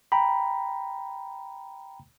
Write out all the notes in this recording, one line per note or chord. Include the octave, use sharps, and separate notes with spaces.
G5 A#5 B5